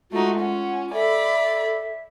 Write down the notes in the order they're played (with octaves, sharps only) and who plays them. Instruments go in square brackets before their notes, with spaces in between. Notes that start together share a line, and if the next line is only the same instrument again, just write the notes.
[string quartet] G#3 A3 D#4 [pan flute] F4 [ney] F#4
[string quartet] C#4 [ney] F#5
[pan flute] A4 [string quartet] D5 B5 [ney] E5